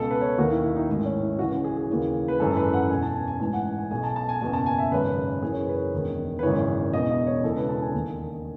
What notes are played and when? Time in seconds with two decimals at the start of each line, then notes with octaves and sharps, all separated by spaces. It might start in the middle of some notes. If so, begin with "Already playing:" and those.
Already playing: C#2 B2 A4
0.11 B4
0.21 C#5
0.38 D#2 D#3 F#4
0.51 E4
0.63 E4
0.76 D#4
0.89 A1 G#2 D#3 E4
1.05 C#4
1.23 E4
1.39 C#2 C#3 E3 F#4
1.52 F#4
1.64 G#4
1.77 G#4
1.89 D#2 C#3 E3
2.28 B4
2.40 G#1 F#2 E3 A4
2.57 B4
2.73 F#5
2.90 E1 E2 B2 G#5
3.03 A5
3.16 G#5
3.28 G#5
3.40 A1 G#2 E3 G#5
3.53 F#5
3.66 G#5
3.78 G#5
3.91 B1 B2 G#5
4.04 A5
4.16 A5
4.29 G#5
4.41 F#1 E2 B2 G#5
4.53 A5
4.66 G#5
4.79 E5
4.92 G#1 F#2 C#3 B4
5.42 F#1 F#2 E3 G#4
5.53 C#5
5.59 B4
5.69 B4
5.76 C#5
5.93 E1 E2 D#3
6.39 B4
6.43 G#1 F#2 C#3 E3 C#5
6.93 E1 E2 B2 D#5
7.10 D#5
7.27 C#5
7.44 E1 E2 C#3 E3 A4
7.56 B4
7.69 A5
7.81 G#5
7.94 E1 D#2 D#3